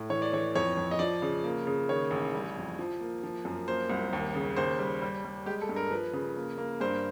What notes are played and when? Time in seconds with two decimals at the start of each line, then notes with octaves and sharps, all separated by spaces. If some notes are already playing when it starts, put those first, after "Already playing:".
Already playing: A2
0.10 E3 C#5
0.22 D5
0.33 E3 C#5
0.55 F2 C#5
0.77 F2
0.91 D#5
0.99 F3 D5
1.22 C#3
1.44 A#3
1.67 C#3
1.89 D#3 C#5
2.11 A1
2.34 G3
2.56 F2
2.79 F3
3.00 A#3
3.23 F3
3.45 F#2
3.68 A#3 C5
3.90 C2
4.13 D#2
4.35 C#3
4.56 D#2 C5
4.79 G3
5.02 G3
5.24 G3
5.46 G#3 G4
5.61 A4
5.69 G2
5.76 A#4
5.91 F3 B4
6.13 C#3
6.36 A#3
6.58 A#3
6.81 G2 C5